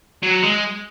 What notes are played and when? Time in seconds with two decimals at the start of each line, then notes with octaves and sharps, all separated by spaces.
0.23 F#3
0.43 G#3